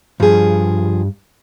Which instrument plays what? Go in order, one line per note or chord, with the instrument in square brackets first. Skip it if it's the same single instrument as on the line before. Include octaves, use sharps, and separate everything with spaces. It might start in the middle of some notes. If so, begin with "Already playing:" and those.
[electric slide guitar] G2 [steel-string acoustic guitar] F3 G#4